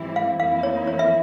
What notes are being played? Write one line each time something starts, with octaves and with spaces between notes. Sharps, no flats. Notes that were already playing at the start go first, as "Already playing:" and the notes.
Already playing: G#2 E3 G3 C4 E4
F5
F2 E3 A#3 E4 F5
C#5
C#5
E5